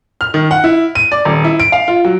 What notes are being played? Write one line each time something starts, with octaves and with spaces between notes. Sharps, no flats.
F6
D#3
F#5
E4
D#7
D5
D#1
E4
D7
F5
F4
F#3